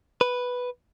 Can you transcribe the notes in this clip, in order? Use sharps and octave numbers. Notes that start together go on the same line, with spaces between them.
B4